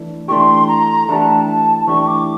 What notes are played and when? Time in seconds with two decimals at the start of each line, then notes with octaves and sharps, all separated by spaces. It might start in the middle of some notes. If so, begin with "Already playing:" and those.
Already playing: E3 A3 D4
0.28 E3 A3 D4 G4 C6 C#6
0.68 A#5
1.08 E3 A3 D4 G4 A5 A#5
1.48 A5
1.87 E3 A3 D4 G4 C#6
2.07 D6